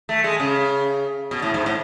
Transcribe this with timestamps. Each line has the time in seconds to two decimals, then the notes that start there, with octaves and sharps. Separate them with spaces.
0.09 A3
0.24 G#3
0.40 C#3
1.31 B2
1.42 A2
1.54 G#2
1.66 A2